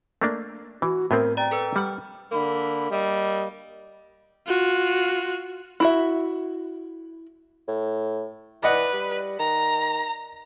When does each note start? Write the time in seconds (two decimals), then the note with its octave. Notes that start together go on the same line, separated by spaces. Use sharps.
0.22 A3 A#3 D4
0.82 E3 F#4
1.11 A2 B3 C4 F#4 A#4
1.37 D5 G5 A#5 A6
1.51 A4 B4 E6
1.76 G3 F#5 F6
2.31 D3 A#3 B5
2.90 G3 A#3 D#5
4.47 F4 F#4
5.80 E4 F#4 E5
7.68 A2
8.63 E3 B4 D5 D#5 F#5
8.93 G3
9.39 D#3 A#5